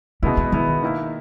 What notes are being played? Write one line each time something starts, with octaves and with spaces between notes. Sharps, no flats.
B2 G#3 B3 C#4 E4
B3
B2 D#3 G#3 B3 E4
D#3 A#3 E4